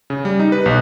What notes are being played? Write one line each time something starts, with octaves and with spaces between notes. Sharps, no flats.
C#3
G3
D#4
B4
B1